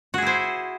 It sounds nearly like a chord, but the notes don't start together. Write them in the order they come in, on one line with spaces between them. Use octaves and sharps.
F#4 G#4 E4 C5